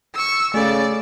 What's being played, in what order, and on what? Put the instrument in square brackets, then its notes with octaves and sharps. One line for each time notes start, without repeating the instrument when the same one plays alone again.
[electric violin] C#6 E6
[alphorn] C#3 [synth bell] A3 A4 [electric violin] D5